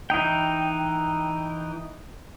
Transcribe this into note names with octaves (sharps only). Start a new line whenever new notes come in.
E3 D#4 G5